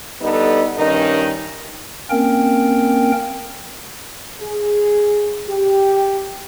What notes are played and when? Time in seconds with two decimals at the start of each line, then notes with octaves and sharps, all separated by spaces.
0.22 D3 G3 B3 D#4 A4
0.77 G2 D#3 C#4 D#4
2.10 A#3 C4 C#4 A#4 G5
4.41 G#4
5.49 G4